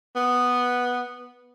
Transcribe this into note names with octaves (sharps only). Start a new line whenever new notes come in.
B3